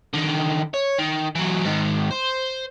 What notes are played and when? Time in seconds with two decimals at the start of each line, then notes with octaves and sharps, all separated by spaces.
0.14 D3 D#3
0.74 C#5
0.98 D#3
1.35 E3 F#3
1.65 G#2 D#3
2.11 C5